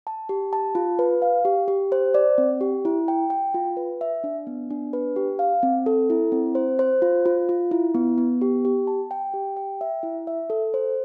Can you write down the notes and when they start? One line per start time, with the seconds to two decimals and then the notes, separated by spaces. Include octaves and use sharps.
0.07 A5
0.29 G4
0.53 A5
0.75 F4
0.99 B4
1.22 F5
1.45 G4
1.68 G4
1.92 C5
2.14 D5
2.38 C4
2.61 G4
2.85 E4
3.08 G5
3.30 G5
3.54 F4
3.77 B4
4.01 E5
4.24 D4
4.47 B3
4.70 D4
4.93 B4
5.16 G4
5.39 F5
5.63 C4
5.86 A4
6.10 E4
6.32 C4
6.55 C5
6.79 C5
7.02 F4
7.26 F4
7.49 F4
7.71 E4
7.94 B3
8.18 B3
8.41 G4
8.65 G4
8.87 A5
9.11 G5
9.34 G4
9.57 G5
9.81 E5
10.03 E4
10.27 E5
10.50 A4
10.74 C5